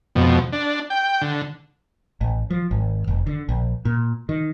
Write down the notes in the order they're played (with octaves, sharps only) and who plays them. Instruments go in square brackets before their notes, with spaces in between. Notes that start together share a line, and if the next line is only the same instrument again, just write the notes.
[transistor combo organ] F2 B2
D4
G5
D3
[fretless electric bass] A1
F3
G#1
F1
D3
A#1
A#2
D#3